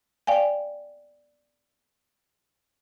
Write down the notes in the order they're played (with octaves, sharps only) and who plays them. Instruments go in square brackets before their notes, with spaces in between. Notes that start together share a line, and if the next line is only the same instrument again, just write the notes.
[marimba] D5 F5 G5 G#5